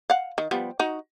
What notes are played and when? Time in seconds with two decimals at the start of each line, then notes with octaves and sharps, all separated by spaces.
0.10 F5 F#5
0.38 D#3
0.51 F3 G3 B3
0.79 D#4 F#4